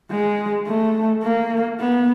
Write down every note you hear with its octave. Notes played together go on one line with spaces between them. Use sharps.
G#3
A3
A#3
B3